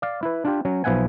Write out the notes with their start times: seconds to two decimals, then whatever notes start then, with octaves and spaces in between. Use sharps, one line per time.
0.02 D5 F5
0.23 E4 B4
0.45 D4 F4 G4
0.65 F#3 C#4
0.84 B1 F3 B3 E5 F#5 G#5